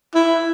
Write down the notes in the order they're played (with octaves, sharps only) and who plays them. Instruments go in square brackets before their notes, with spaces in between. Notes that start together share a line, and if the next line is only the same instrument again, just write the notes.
[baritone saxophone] E4